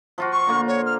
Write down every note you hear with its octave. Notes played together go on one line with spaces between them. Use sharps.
F3 F4 F#4
C#6
D3 A#3 F4
C#5
F6